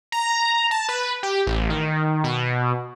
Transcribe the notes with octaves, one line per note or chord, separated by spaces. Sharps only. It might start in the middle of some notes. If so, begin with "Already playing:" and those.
A#5
A5
B4
G4
A1
D#3
B2